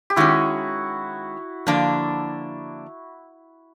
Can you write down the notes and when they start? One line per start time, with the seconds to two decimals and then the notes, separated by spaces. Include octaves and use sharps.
0.10 G4
0.16 D#3 G#3 C#4 E4 F#4
1.67 D3 F3 A#3 D4